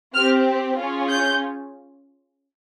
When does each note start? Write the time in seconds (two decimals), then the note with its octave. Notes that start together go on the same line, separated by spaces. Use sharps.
0.14 C4 G4 F6
0.77 C#4 F4 G#4
1.09 G6